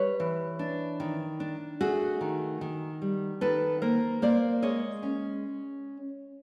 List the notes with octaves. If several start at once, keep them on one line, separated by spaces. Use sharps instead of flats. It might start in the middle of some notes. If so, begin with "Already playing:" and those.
Already playing: G3 B4 C#5
E3
D4
D#3
D4
A3 F#4 G#4
D#3
D#3
G3
D#3 A4 B4
A#3 A#4 C5
A#3 C5 D5
G#3 C#5 D#5
C#4